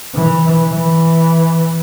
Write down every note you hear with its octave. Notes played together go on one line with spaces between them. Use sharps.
E3
E3